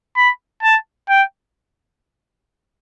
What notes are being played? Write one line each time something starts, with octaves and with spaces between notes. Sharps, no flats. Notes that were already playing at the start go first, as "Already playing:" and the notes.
B5
A5
G5